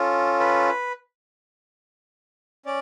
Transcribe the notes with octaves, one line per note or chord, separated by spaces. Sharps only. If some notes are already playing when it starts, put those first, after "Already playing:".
Already playing: C#4 F4 A4
B4
C#4 D5